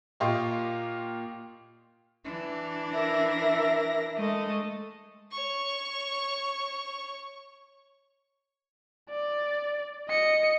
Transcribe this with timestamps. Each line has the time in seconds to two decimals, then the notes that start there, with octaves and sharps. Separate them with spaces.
0.20 A#2 F4 G4 D#5 C6 C#6
2.25 E3 D4
2.93 A#4 E5 A#6
4.16 G#3 A3 D#5
5.31 C#5 C#6
9.10 D5
10.09 D#5 C#7